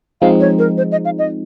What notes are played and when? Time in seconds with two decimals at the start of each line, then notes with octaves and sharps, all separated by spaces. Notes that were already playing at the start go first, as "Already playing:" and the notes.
0.21 F3 G#3 C4 D#4 F5
0.40 C#5
0.58 A#4
0.78 C5
0.92 D#5
1.05 F5
1.19 D#5